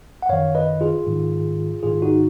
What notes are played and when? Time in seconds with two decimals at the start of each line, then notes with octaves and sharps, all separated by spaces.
0.22 F#5
0.29 F#2 D#3 C#5 F5
0.55 B4 D#5
0.81 F4 G#4
1.07 G#2 D#3
1.83 G#2 D#3 F4 G#4
2.02 D#4 F#4